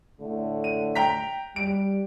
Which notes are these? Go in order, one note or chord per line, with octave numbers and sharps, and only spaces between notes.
A2 D3 A3
D#7
G5 A#5 B6
G3 D7